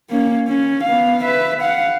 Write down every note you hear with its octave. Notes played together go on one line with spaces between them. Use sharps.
A#3 C#4
C#4
B3 F5
B4 E5
F5 F#5